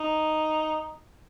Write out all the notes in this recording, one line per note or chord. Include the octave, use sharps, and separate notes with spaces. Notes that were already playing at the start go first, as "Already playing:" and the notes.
Already playing: D#4